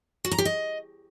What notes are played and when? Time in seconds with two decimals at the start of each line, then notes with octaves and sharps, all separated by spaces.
0.25 F#4
0.31 A#5
0.38 G4
0.45 D#5